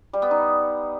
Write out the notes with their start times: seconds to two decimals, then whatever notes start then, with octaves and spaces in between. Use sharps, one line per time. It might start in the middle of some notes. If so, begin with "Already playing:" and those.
0.13 G3
0.22 B3
0.31 D#4